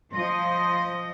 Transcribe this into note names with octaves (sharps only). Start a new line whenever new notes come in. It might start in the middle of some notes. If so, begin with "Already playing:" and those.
F3 D#5 C6